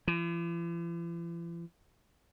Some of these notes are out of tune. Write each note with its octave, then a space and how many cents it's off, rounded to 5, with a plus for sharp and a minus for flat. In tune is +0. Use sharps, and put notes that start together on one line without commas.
E3 +45